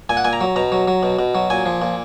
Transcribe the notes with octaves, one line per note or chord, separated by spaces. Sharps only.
A#2 G#5
F#5
A#2 G#5
A#5
F#3
B2 A#5
F#3
F#3
B2
B2
F#3
A#2 G#5
F3
A#2